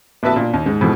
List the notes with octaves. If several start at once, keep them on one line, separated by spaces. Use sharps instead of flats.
A1 B3 F#4 B4 E5 A5
A#2 D4
D#2
G#2
F2 G#2 B2 E3